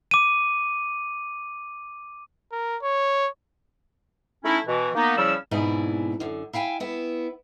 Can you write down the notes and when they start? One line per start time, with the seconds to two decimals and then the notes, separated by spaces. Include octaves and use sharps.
0.11 D6 D#7
2.52 A#4
2.82 C#5
4.44 A3 C#4 D#4 E4
4.66 B2 E3
4.95 A#3 B3 D#4
5.17 C#3 F3 G3 C#4 E4 E6
5.51 G#2 B2 C4 D4 E4 G#4
6.20 F#2 D3
6.53 E4 F5 G5 G#5
6.80 B3 E4